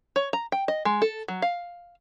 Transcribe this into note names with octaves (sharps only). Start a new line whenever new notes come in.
C#5
A#5
G5
D#5
G#3
A4
F#3
F5